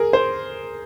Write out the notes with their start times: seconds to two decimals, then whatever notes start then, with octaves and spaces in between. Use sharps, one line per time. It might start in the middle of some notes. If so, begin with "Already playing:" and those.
Already playing: G#4 A#4
0.13 C5